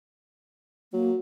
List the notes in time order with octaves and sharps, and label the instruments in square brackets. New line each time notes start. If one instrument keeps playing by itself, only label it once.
[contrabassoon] F#3 [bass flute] A#3